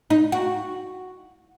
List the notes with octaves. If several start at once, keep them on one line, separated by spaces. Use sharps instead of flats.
D#4
F#4